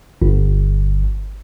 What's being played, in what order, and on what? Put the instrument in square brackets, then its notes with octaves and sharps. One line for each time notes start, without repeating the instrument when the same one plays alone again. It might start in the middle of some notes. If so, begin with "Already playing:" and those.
[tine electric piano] G1